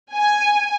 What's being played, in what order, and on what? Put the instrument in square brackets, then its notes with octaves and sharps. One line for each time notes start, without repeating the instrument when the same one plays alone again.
[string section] G#5